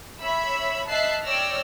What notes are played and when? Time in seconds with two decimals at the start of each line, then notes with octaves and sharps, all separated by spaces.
0.22 C#5 E5 B5 E6
0.89 D#5 E5 A5 F#6 C7
1.25 C#5 D5 G5 E6 F6 A#6